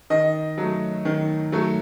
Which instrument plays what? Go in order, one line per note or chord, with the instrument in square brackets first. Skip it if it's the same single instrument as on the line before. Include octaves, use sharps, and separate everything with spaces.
[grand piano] D#3 D#5
F#3 A3
D#3
F#3 A3